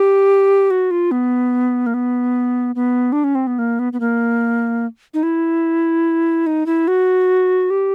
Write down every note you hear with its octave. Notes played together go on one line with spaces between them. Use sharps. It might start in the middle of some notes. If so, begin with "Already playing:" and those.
Already playing: G4
F#4
F4
B3
A#3
B3
B3
D4
C#4
C4
B3
A#3
B3
B3
A#3
D#4
E4
D#4
E4
F#4
G4